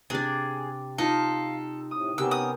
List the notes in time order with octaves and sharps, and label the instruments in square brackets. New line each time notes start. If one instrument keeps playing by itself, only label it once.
[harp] C3 [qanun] D4 D5 [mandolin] G#4
[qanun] D#4 F4 [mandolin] A4 [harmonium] F5
[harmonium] A2 C3 [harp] D#6
[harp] C3 G4 [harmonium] B3 C#4 A#4 [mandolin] E6
[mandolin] D#6